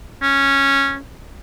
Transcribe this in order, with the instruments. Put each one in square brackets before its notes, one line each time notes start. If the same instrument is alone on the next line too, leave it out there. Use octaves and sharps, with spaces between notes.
[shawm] C#4